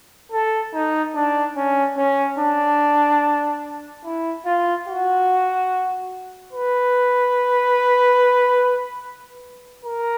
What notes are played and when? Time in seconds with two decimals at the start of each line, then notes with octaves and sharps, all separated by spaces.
0.32 A4
0.74 D#4
1.15 D4
1.56 C#4
1.97 C#4
2.39 D4
4.05 E4
4.46 F4
4.88 F#4
6.53 B4
9.85 A#4